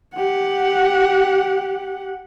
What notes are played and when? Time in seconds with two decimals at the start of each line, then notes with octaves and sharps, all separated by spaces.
0.15 G4 F#5